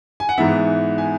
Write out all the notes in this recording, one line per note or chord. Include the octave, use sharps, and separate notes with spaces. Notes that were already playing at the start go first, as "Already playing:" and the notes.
G#5
F#5
G#2 E3 B3 E5
G#5